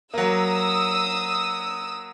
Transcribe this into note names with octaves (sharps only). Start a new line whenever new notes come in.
F#3 A#3 D#6 E6